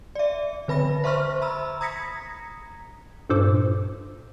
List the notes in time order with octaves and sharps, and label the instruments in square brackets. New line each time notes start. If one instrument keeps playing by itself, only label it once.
[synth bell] D5 E5
D3 B4 B5 A#6
C5 E5 C6 C#6 F6
A#5 B5 E6
A#5 D#6 G#6 A#6 B6 C#7
[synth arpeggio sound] G2 A#2 A4 C5 D6